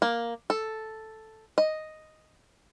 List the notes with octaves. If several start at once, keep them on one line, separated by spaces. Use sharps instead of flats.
A#3
A4
D#5